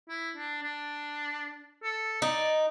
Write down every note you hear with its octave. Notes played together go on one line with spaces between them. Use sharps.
E4
D4
D4
A4
D#4 D5